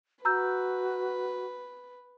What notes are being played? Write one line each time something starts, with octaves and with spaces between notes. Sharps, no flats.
F#4 B4 A#5 E6 G6